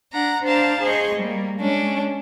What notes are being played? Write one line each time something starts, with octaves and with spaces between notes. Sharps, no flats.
D4 F#5 A#5
D4 C5 F5 A5 A#5
G#4 C5 D#5 C#6
G3 A#3
G#3 C#4 D4